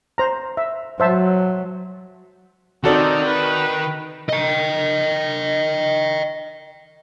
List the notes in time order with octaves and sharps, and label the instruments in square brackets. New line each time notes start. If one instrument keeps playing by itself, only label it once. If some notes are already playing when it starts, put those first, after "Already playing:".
[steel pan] C5 A#5
E5
[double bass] F#3 [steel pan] C5 E5 A5
[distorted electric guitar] D#3 [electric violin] C4 D#4 [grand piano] F#4 A4 D5
[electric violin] B4
[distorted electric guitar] D#5 G5